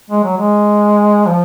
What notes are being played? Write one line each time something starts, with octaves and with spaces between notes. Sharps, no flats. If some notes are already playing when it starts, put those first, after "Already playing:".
G#3
F#3
G#3
F3